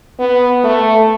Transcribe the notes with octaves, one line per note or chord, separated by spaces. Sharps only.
B3
A3